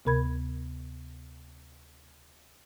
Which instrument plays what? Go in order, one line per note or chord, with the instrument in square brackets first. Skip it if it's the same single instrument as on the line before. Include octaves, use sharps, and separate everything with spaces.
[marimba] D2 C3 A#4 B5 G#6